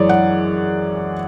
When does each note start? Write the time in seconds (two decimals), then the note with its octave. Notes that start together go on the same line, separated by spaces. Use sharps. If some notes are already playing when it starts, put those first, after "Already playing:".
Already playing: F#2 E3 G#3 G#4 C#5 D5
0.09 F#5